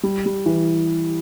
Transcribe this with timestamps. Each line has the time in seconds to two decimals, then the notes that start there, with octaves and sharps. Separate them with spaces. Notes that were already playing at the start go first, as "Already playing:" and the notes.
0.03 G3
0.26 G3
0.46 E3